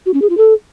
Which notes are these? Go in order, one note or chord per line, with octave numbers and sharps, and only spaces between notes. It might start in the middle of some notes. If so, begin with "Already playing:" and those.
F#4
C#4
G#4
F4
A4